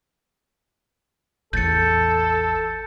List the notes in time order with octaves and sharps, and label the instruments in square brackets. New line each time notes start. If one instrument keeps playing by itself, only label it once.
[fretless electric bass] A1 E2 [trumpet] A4 [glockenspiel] G6 A6 C#7